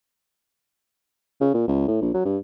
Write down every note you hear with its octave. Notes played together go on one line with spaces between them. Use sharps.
C#3
A#2
C#2
A2
A#1
F#3
G2